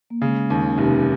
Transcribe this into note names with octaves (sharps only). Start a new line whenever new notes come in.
A#3
C#3 G#3
D#2 C#4
F1 D#4 G4